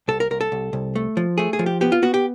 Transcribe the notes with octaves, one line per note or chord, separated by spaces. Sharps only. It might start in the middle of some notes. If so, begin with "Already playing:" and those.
C2 A4
A#4
C2 A#4
A4
C2
C2
A3
F3
A3 G#4
G#4
F3
G4
B3 G4
F4
B3 F#4
G4